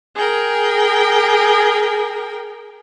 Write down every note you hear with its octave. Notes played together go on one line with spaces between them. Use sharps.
G#4 A#4 G5